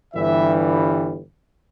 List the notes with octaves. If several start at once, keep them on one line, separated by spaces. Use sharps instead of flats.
G1 G2 E3 G3 E5